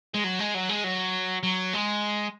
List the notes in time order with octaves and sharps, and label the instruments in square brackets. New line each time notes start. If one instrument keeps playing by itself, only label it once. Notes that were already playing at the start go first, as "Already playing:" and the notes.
[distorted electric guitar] G#3
F#3
G#3
F#3
G#3
F#3
F#3
G#3